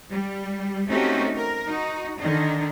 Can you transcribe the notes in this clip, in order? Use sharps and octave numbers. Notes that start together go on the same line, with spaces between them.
G3
A3 C4 C#4 D#4 F#4 G4
A#4
D#4 F#4
D3 D#3 D4 D#4